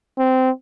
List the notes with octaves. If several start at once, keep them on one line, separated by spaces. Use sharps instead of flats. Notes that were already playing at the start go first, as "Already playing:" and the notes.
C4